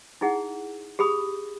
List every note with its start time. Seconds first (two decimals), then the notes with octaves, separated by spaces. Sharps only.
0.21 D#4 E4 G#4 F#5
0.99 G4 G#4 B5 D#6